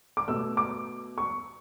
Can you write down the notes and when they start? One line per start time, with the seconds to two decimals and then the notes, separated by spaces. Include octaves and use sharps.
0.17 D6
0.28 B2 A3 E6
0.57 D6
1.18 C#6